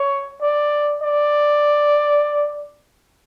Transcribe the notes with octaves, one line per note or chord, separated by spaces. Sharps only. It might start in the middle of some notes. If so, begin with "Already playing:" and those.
Already playing: C#5
D5
D5